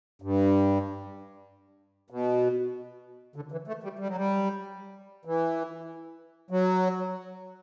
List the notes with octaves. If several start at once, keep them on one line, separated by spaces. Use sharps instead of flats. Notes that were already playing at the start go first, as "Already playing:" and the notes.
G2
B2
D3
E3
A3
G3
G3
F#3
G3
E3
F#3